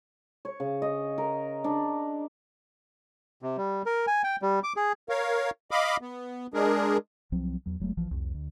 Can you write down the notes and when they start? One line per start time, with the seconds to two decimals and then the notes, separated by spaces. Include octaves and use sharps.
0.45 C#5
0.60 C#3
0.82 D#5
1.18 A#4
1.64 D4
3.42 C3
3.57 G3
3.86 A#4
4.07 G#5
4.24 G5
4.42 G3
4.63 D6
4.76 G#4
5.09 A#4 C#5 F5
5.71 D#5 F5 B5 D6
6.01 B3
6.54 G#3 D4 G#4 A#4
7.32 C2 F3 F#3 C4
7.66 E2 F#3
7.80 F1 F#3 G#3 A3
7.97 A#1 E3 F3
8.11 C2 F2
8.34 D2